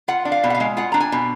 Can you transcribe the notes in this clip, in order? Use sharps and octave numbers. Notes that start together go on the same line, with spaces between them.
F4 F#5
D4
F5
B2
F#5
F5
G#3
F4 F#5
D4 A#5
G#5
B2